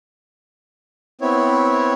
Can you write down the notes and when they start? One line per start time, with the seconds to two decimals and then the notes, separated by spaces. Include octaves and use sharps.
1.21 B3 C4 E4 C#5